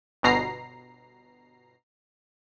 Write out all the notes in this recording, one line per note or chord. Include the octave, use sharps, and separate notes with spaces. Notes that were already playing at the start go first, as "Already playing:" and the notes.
G1 B2 A#5 C7